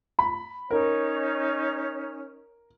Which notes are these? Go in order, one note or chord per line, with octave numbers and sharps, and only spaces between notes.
B5
C#4 D#4 A#4 C#5